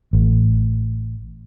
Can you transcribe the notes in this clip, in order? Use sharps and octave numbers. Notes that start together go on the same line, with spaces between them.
A1